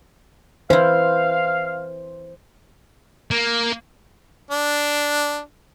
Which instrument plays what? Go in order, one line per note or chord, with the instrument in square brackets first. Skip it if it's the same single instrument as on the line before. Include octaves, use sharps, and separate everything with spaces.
[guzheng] E3 E4 [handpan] C5 [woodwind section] F5
[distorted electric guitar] A#3
[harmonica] D4